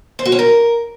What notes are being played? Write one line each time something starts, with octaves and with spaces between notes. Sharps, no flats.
C5
F#4
C#4
A#4